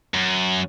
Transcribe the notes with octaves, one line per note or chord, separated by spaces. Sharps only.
F#2